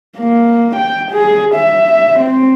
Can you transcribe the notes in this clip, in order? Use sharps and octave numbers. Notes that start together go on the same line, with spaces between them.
A#3
G5
G#4
E5
C4